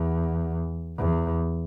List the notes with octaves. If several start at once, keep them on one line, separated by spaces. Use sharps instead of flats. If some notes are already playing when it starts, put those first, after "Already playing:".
Already playing: E2
E2